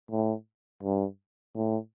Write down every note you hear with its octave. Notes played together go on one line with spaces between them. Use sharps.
A2
G2
A2